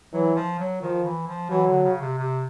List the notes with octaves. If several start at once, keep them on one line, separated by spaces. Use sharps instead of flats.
E3 F#3
F3
F#3
D#3 F3
E3
F3
E3 F#3
D3
C#3
C3
C3